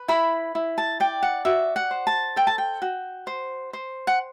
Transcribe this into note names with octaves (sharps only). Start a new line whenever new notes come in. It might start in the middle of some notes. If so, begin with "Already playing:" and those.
Already playing: B4
E4 B5
E4
A5
D5 G5
F#5
F#4 E5
F#5
C5
A5
A4 G5
A5
G5
F#4
C5
C5
F#5